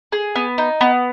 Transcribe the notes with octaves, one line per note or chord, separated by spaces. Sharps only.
G#4
B3
D#4
B3